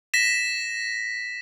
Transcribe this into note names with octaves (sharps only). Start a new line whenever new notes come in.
A#6 B6 E7